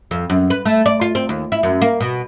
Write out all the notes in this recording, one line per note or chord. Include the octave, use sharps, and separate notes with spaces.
F2
F#2
B4
A3
D5
F4
C4
D#2
E4
F#2
A#3
B2